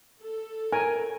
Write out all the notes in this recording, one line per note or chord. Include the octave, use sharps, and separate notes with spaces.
A4
A#4 G#5